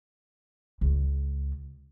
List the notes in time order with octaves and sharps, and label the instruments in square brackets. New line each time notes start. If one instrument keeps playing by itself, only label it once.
[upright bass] C#2